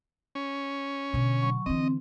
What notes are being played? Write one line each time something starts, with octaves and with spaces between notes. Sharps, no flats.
C#4
B2 D3
F#3 C#6
D3 E3 C4 D#5